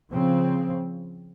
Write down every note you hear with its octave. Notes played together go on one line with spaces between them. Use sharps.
C#3 F3 C4